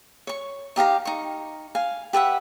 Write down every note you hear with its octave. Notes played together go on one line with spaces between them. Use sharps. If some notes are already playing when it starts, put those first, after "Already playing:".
C#5 C#6
D#4 G4 F5 A#5
D#4 C#6
F5 G#5
G4 B4 E5 F#5